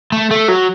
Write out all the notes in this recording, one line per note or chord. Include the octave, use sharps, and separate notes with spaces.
A3
A3
F#3